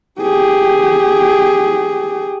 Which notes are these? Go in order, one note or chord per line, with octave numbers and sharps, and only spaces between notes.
G4 G#4